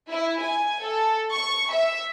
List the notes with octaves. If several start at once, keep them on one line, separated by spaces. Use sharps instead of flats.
E4
G#5
A4
C#6
E5